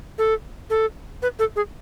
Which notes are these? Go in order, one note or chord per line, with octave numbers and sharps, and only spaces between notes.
A4
A4
B4
A4
G#4